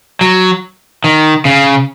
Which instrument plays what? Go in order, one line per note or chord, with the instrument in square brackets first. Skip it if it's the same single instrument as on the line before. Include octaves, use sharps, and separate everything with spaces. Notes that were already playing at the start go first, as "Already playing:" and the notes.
[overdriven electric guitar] F#3
D#3
C#3